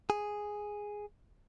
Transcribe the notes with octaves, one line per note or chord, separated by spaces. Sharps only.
G#4